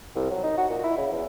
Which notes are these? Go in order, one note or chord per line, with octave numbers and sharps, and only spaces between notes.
C2
F#3
D#4
F#4
A#2
E4
C#3
E2